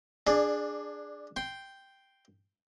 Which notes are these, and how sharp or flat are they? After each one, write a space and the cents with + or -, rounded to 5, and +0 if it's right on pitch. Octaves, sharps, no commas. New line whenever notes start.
D4 +0 G#4 +0 D5 +25
G5 +0 C6 +0